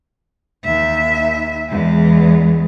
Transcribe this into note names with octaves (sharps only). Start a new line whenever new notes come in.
D#2 E5
E2 G#3